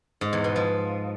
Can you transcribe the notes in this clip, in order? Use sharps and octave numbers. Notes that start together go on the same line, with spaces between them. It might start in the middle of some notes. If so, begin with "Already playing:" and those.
G#2
E2
B2
F3